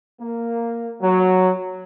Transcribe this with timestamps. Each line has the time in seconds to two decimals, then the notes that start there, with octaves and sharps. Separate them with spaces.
0.21 A#3
1.02 F#3